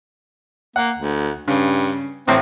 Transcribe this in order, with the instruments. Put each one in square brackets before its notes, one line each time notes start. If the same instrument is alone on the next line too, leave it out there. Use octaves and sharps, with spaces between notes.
[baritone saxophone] A#3 [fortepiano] F#5
[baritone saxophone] D2
[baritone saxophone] G2 [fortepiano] C#3
[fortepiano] A1 A2 [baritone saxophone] C4